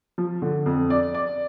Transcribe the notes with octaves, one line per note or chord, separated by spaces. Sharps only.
F3
D3
F2
D5
D5